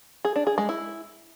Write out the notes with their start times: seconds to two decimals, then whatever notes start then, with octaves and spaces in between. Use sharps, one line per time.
0.25 G#4
0.36 D4
0.47 G#4
0.58 G#3
0.69 E4